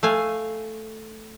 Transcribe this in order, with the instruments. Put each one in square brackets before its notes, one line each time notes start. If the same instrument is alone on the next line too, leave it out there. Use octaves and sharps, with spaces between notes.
[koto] A3 F5 G#5